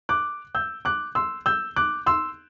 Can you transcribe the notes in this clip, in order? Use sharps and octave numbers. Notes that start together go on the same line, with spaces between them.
D6 F#6
E6 G6
D6 F#6
C6 E6
E6 G6
D6 F#6
C6 E6